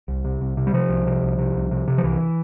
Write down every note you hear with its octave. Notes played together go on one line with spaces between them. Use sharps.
C2
C3
C2
C3
G3
C3 F3
C2
C3
C2
C3
C2
C3
C3
F3
C2 E3